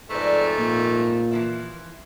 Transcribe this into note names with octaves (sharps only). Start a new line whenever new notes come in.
F2 G#2 A3 B4 D5
A#2
E3 F3 E4